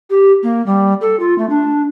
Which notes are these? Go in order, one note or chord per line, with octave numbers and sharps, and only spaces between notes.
G4
A#3
G3
A4
F4
A3
D4